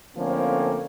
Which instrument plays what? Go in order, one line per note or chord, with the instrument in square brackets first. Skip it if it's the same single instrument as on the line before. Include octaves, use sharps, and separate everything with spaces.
[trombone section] D3 F3 A3 A#3 C4 C#4